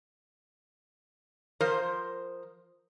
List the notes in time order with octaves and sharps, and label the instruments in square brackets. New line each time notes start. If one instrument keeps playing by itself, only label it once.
[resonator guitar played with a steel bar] F3 A#4 C5